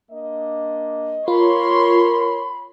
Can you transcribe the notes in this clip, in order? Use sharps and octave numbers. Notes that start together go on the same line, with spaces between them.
A#3 D4 D#5
F4 A#4 C#5 B5 C6